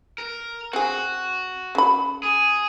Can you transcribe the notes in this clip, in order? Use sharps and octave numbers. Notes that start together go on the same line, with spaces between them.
A#4
C4 F#4 G#4
C#3 B5
G#4